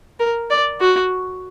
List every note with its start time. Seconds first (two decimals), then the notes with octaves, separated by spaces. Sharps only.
0.20 A#4
0.51 D5
0.81 F#4